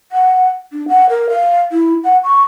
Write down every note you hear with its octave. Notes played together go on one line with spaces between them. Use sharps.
F#5
D4
F#5
A#4
F5
E4
F#5
C#6